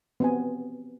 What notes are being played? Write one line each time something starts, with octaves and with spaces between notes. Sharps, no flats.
B3 C4 G#5